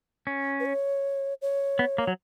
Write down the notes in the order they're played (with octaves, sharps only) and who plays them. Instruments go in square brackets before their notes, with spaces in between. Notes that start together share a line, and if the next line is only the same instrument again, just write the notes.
[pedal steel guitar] C#4
[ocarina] B4
C#5
C#5
[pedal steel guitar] B3
A#3
F#3